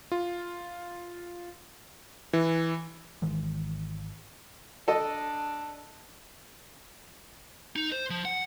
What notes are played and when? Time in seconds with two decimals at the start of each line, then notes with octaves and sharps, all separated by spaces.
0.12 F4
2.33 E3
3.22 G#1 D#3 E3 G#3
4.88 D4 A4 D#5
7.76 D#4
7.92 C5
8.10 F3
8.25 F#5